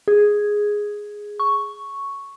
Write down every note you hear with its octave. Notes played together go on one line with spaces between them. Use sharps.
G#4
C#6